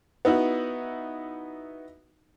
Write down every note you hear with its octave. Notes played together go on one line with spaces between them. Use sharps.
B3 D#4 E4 F#4